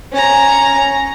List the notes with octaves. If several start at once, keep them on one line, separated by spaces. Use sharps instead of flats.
C#4 A#5